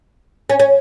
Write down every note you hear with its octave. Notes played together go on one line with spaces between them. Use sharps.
C#4
C#4